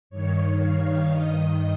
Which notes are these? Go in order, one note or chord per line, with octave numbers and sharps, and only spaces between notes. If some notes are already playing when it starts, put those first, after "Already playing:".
G2 D#3 C#5
F5
G2 D#3 D#5